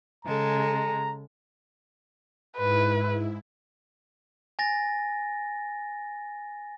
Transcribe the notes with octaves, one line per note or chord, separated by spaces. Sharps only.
C#3 G#3 A4 A#5
G#2 E4 B4
G#5 A6 A#6